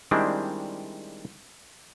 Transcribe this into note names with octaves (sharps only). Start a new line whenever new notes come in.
D#3 G3 G#3 C4 D4 E4